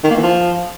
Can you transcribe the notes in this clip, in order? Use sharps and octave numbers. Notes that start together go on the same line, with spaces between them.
D#3
A#3
E3
F3